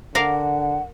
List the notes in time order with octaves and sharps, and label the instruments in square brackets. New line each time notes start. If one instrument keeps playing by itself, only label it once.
[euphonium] D3 [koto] A#4 D5 F5 [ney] F#5